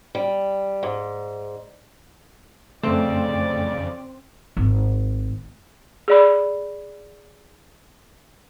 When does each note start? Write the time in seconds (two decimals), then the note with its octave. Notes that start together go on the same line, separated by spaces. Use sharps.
0.15 G3
0.83 G#2
2.83 F2 C#3 A3 C4 D5
4.57 G#1
6.08 G#4 D5 B5